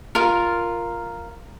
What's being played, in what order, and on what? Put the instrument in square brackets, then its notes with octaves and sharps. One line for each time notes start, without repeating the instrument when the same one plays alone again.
[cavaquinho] F4 A#4